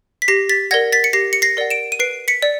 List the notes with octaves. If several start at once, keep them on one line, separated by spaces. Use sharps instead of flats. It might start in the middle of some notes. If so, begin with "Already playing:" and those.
B6
G4 A#6 C7
A6 B6
A#4 D5 F#5 G#6 A#6
A6 B6
C#7
G4 A#6 C7
C#7
A#6 C7
A#4 D5 F#5
D7 E7
D#7
B4 C7 D7
B6 C#7
D5